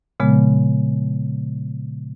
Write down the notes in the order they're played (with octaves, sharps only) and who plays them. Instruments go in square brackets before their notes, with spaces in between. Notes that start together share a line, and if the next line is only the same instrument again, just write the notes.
[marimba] A#2 C#3 F3 G#3 B3